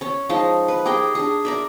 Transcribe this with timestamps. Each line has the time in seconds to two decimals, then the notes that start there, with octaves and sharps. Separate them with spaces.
0.01 C#4 C#5
0.29 F3 G#3 D#4 A5
0.68 B4
0.86 G4 G#4 A#4 G5
1.15 D4 G#4
1.45 A#4 D5 E5